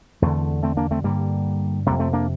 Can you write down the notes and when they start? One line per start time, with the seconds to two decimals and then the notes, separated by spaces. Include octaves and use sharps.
0.22 E2 D3 A3 C4
0.63 A3 C4
0.77 A#3 D4
0.91 A3 C4
1.04 G2 D3 G3 A#3
1.86 F2 C3 G3 A#3
2.00 A3 C4
2.13 A#3 D4